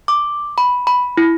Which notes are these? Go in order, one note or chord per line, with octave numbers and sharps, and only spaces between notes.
D6
B5
B5
E4